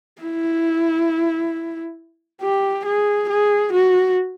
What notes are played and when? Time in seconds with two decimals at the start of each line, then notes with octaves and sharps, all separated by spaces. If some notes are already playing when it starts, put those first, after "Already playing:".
0.22 E4
2.42 G4
2.85 G#4
3.30 G#4
3.73 F#4